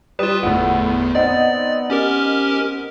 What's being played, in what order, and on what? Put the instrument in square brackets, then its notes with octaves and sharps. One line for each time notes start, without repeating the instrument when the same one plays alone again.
[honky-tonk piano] G3 D#6 E7 [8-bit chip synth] F4 B4
[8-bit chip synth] G1 E2 [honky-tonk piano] A2 B3
[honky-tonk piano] B3 C4 D#4 [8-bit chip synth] D5
[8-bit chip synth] C#4 G4 A#4